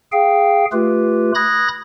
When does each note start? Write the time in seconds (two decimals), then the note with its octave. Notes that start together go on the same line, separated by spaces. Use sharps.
0.12 G#4 F5 G5
0.72 A3 F4 G4 B4
1.35 B5 D#6 F#6 G#6 A#6